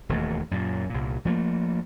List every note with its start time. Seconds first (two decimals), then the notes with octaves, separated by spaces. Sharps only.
0.09 E1 D#2 A3
0.51 F#2 A#2
0.90 C2 A#2
1.25 F3 G3 A3 A#3